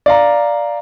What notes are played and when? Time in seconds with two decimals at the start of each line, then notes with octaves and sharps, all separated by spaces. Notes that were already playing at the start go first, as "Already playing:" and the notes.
0.06 D5 F5 A#5